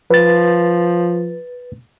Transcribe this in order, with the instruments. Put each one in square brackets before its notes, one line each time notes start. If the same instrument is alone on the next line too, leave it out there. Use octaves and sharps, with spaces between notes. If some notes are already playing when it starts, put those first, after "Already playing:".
[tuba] F3 [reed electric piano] B4 A6